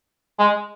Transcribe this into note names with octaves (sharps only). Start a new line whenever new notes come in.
G#3